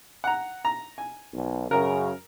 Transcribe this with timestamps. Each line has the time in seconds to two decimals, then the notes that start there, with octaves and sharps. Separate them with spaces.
0.24 F#5 A#5
0.65 A#5
0.98 G#5
1.34 B1
1.71 F#2 C#3 A#4 A#5